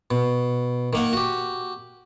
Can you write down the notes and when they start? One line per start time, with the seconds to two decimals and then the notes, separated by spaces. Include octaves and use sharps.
0.11 B2
0.93 D#3 A#3 F#5
1.13 F#4 G4